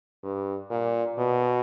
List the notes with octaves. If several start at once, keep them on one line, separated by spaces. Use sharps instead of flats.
G2
A#2
B2